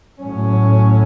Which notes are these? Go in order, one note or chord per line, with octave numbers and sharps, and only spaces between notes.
A2 F#3 C#4